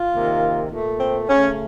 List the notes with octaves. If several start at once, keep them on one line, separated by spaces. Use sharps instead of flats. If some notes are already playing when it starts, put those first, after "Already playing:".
Already playing: F4
C3 D#3 A#3
A#2 A3
C4
C#3 A3 C#4